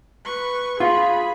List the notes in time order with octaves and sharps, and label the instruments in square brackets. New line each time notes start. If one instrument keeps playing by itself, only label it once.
[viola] B4 C#6
[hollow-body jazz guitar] F4 [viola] G#4 B5